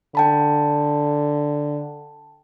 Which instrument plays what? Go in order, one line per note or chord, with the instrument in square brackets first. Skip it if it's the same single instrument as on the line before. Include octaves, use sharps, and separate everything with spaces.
[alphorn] D3 [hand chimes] G5 A5 B5